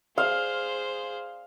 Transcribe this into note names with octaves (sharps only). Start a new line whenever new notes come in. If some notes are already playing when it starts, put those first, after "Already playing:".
G#4 C5 F5